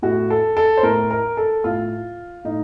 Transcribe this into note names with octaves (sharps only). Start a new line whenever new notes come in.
A2 F#4
A4
A4
C5
A2 A#4
A#4
A4
A2 F4
A2 D#4